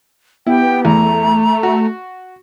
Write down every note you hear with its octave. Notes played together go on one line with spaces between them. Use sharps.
B3 E4 G4 G5
E2 A3 A#5
F#4